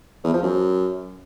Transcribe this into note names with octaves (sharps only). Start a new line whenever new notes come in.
E2
F3
F#2